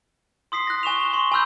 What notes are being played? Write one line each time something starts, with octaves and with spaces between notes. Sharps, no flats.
C6 D#6 B6 C7
F#6 A#6
G#5 C#6 E7 F7
G7
C6 C#6
G#5 B5 C6 E6 F#6 G6